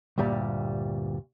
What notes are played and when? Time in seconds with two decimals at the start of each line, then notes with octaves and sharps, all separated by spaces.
0.18 D2 G2 A#2 G3